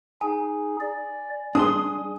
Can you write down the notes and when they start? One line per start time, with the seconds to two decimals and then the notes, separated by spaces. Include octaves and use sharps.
0.21 D#4 G#4 G#5
0.81 D5
1.55 G3 D4 G#4 C6 D#6